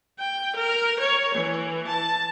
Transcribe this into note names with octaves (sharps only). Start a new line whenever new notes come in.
G5
A#4
C#5
E3
A5